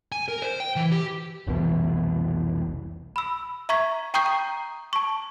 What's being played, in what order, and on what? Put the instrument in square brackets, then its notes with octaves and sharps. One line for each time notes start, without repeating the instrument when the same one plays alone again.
[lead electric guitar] G#5
A#4
C5
G5
E3
G4
[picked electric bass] F1 C2 B2 E3
[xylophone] B5 E6
E5 A#5 C#6 G#6 B6
G5 A#5 C#6 D#6 G6 C7
A#5
A5 C#6